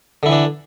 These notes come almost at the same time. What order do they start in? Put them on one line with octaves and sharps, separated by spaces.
D3 E4 E3 D4